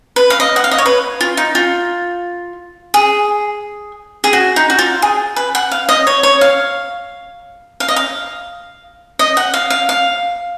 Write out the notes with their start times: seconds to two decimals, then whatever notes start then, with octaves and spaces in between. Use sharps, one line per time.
0.16 B4
0.30 F5
0.40 D#5
0.56 F#5
0.64 F5
0.71 D#5
0.78 C#5
0.86 B4
1.21 F4
1.37 D#4
1.55 F4
2.94 G#4
4.24 G#4
4.33 F#4
4.56 D#4
4.70 F#4
4.79 F4
5.02 G#4
5.36 B4
5.55 F#5
5.72 F5
5.89 D#5
6.07 C#5
6.23 C#5
6.41 F5
7.80 F5
7.88 D#5
7.96 F5
9.19 D#5
9.37 F#5
9.54 F5
9.70 F5
9.89 F5